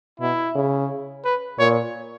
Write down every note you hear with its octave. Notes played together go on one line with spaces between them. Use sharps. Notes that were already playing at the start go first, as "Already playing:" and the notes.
B2 E4
C#3
B4
A#2 C#5